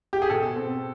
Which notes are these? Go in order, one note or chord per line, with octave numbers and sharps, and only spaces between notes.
G4
G#4
B2 A4
C4